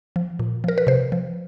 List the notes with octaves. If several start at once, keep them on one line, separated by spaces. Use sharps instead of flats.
F3
A#2
F3 A#4
B4
C3 C5
F3